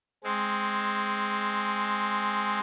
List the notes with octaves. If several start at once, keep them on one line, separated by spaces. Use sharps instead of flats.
G#3 C4